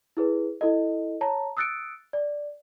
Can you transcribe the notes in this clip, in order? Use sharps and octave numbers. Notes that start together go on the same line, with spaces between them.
E4 G#4 B4
E4 A4 D#5
C#5 A5 A#5
D#6 E6 F#6 A6 C#7 D7
D5